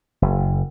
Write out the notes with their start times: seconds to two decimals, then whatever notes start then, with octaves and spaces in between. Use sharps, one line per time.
0.22 F#1